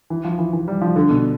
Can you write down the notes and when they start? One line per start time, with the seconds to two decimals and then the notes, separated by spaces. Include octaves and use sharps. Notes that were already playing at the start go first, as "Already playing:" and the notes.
0.10 E3
0.25 F3
0.39 E3
0.53 E3
0.68 G3
0.82 F3
0.96 D3
1.10 B2